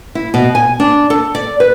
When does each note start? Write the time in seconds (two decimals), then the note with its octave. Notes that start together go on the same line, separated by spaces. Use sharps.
0.15 E4
0.34 B2
0.55 G#5
0.80 D4
1.10 A4
1.35 D5
1.60 B4